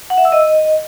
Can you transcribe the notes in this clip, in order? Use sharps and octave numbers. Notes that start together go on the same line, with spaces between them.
F#5
E5
E6
D#5